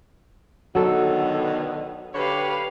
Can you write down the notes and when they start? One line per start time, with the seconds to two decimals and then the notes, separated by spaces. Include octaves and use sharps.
0.75 B2 D3 D#3 F#3 A4
2.14 D3 G4 B4 C#5 F5